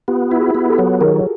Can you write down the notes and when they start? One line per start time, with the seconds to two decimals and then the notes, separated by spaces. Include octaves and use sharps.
0.08 B3 F4 G4
0.31 E4
0.39 F#4 G#4
0.55 B3
0.70 G4 A4
0.78 F#3
1.01 D#3 G#4 A#4